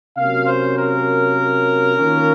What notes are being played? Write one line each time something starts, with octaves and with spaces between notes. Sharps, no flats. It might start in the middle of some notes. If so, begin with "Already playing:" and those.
C3 F#3 A#3 C#4 F5
C5
A#4
D#3 A#3 C#4 F4